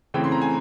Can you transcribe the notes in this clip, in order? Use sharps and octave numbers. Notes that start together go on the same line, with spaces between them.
C#3 E3 A3 C4 G5
C6
A#5
G#5